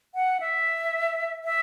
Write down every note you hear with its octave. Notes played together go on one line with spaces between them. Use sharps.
F#5
E5
E5